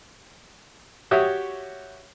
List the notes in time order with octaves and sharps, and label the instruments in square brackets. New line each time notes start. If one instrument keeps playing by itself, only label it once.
[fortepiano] F#4 G4 C#5 E5 D#6